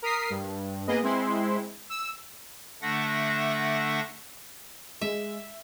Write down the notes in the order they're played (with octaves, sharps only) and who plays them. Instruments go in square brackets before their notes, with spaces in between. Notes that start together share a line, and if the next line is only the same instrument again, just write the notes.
[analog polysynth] A#4 D#6 B6 C7
G2
A#3 B3 G#4 B4 D#5
G#3 C4 E4 C6
E6
[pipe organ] D3 A3 D4 E5 F#5 A#6
[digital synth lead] G#3 [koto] E5